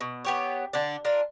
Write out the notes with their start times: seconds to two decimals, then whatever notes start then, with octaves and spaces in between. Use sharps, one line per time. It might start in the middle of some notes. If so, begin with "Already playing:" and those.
0.01 B2
0.25 B3 G4 C#5
0.73 D3 D4
1.05 D4 F4 A#4